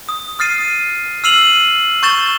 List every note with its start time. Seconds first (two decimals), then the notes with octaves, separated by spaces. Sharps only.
0.09 D#6
0.39 D#6 F6 A6 C7 D#7
1.24 E6 F6 C7 D#7 F7 F#7
2.03 C#6 G6 A6 E7 G7